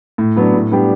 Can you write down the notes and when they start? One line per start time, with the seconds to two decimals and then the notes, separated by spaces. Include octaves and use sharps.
0.18 A2
0.36 F#3 B3 D4
0.54 A2
0.72 G3 B3 D4 G4